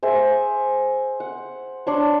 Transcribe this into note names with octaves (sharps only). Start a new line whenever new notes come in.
G#4 C5 E5
F#5
D4 C#5 C6